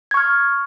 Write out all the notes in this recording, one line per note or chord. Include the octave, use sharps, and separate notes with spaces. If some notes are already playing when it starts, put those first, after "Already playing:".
C#6 F6 G#6